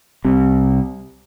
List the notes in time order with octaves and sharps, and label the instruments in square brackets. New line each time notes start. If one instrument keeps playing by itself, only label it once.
[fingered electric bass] C2 C3